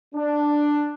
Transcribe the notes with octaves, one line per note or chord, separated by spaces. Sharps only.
D4